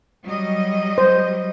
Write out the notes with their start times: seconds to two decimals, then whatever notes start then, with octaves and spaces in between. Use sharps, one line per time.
0.25 F#3 G3 D#5
0.98 C5